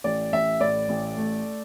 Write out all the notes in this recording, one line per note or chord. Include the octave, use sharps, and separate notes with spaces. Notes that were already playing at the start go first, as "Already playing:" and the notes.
A1 D5
A1 E5
A2 D5
A1
A3